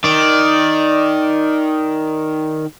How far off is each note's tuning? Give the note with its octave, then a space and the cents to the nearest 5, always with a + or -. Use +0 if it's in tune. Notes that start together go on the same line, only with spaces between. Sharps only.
D#3 +0 D5 +0